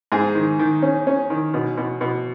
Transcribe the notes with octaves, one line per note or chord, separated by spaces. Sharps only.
G#2 G#4
D#3
D#3
C#4
C#4
D#3
B2
B2
B2